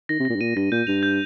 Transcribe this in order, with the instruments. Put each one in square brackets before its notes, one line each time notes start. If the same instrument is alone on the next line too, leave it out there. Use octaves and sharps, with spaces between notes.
[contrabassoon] D#3 [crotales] A#6
[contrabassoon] C3
[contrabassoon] A#2 [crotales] A#6
[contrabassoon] G2
[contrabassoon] A#2 [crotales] D#7
[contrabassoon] G2 [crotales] A#6
[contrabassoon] A#2 [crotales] G6
[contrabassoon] G2 [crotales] F7
[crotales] G6